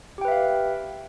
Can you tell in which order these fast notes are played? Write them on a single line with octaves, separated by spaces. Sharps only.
G4 G5 B4 E5 F5